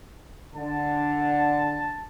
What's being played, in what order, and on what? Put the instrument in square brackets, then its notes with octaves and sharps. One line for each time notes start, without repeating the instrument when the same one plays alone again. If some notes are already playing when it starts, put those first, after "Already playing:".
[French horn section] D3 [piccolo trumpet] A5